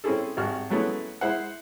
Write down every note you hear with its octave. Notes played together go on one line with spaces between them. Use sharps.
C4 C#4 E4 G#4 A4
G#1 G3 F#4 F6
F#3 G#3 A3 B3 C#4 E4
G#3 E4 C5 E5 F#5